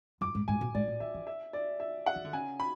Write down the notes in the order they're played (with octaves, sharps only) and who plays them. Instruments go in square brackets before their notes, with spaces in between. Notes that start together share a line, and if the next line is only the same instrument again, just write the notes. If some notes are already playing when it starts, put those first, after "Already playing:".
[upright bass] F#2 [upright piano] D6
[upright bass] G#2
[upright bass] G#2 [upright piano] G#5
[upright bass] B2
[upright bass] G#2 [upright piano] D5
[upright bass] A2
[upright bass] D3 [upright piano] E5
[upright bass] E3
[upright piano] E5
D5
E5
F#5
[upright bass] E3
D3
[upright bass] C#3 [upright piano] G#5
[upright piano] B5